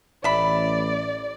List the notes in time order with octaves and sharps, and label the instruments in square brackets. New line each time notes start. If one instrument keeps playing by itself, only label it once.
[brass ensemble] A1 [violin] D5 [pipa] E5 B5